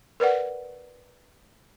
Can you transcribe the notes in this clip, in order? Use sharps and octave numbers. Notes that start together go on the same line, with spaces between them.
A#4 B4 D5 F#5